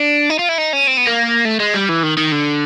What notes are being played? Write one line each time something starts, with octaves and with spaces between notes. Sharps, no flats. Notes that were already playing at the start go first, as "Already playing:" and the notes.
Already playing: D4
D#4
F4
E4
D#4
C#4
C4
B3
A#3
A3
G#3
G3
E3
D#3
D#3
D3